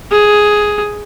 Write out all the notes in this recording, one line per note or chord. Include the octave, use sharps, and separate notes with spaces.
G#4